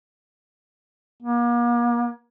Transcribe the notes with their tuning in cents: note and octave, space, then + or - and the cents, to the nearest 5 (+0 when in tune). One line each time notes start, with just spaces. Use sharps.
A#3 +40